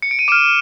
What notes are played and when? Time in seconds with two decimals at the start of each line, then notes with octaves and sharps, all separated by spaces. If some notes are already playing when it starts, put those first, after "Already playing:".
0.02 C#7
0.11 D7
0.19 D#7
0.28 D6 F6 D7 E7